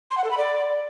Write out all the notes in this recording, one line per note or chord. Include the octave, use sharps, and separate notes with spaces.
C6
F#5
A4
B5
D5